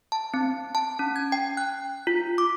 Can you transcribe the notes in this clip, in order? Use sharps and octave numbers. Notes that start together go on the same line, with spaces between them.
A5
C4
A5
C#4
G#6
G5
F#6
F4
D6